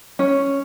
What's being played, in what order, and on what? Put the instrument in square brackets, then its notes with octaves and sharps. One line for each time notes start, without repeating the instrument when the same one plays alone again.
[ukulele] C#4